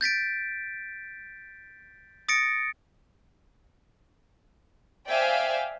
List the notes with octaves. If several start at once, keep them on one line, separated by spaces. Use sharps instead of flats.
G6 A6 B6 D7
D#6 A6 A#6 C#7 D7
C5 D5 E5 F5 G5 G#5